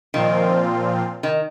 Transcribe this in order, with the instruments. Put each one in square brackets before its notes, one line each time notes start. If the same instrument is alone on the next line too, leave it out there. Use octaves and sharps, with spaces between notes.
[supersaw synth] A#2 F3 C4 F4 [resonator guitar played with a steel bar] D#3
[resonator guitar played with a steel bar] D#3